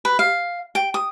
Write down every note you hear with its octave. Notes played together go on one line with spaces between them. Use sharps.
B4
F5
G5
D#6